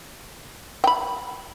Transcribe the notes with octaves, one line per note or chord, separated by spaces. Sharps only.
G5 B5